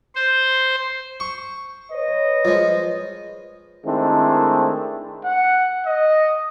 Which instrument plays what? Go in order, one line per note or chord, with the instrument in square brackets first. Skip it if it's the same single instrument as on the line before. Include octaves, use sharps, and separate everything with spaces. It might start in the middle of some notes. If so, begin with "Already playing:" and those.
[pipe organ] C5
[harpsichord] C#6
[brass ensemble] B4 C#5 D#5
[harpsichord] F3 G#3
[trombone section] D#3 G#3 A3 C4 D4 E4
[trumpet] F#5
D#5